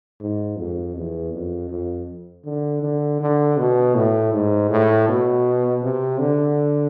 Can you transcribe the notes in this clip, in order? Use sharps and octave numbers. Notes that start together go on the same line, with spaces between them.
G#2
F2
E2
F2
F2
D3
D3
D3
B2
A2
G#2
A2
B2
C3
D3